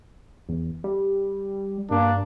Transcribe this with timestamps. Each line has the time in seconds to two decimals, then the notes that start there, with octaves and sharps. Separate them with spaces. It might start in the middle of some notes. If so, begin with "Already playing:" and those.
0.49 E2
0.84 G3
1.91 G2 A#3 D4